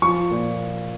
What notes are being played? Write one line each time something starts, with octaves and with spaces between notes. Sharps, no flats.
F3 C#6
A#2